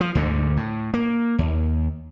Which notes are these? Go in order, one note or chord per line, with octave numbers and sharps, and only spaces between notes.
F3
D2 G#2 D3
A2
A#3
D#2